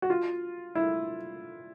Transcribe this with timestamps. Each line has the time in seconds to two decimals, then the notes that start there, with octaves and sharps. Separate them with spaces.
0.02 F#4
0.10 F4
0.75 E4